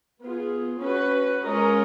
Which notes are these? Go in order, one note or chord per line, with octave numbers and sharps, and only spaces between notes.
B3 F4 G#4
C#4 F#4 B4
G#3 C#4 F4 A#4 D#5